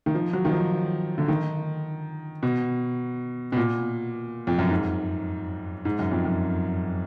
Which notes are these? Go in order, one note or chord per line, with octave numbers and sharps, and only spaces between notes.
D#3
F3
F#3
D#3
F3
D3
D#3
B2
B2
A#2
F2
F#2
G#2
G#2
F#2
F2
F#2